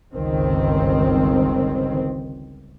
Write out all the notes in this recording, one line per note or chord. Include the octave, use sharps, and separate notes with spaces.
G1 C#2 D#3 C4